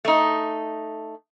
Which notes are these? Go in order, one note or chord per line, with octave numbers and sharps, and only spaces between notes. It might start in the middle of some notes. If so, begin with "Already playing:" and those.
A3 D#4